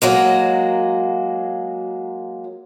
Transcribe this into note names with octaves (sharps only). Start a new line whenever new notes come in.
F#3 G#3 A#3